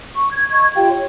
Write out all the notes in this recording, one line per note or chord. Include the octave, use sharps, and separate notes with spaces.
C#6
G#6
D#5 C#6 G#6
F4 G4 F5 G5
C#5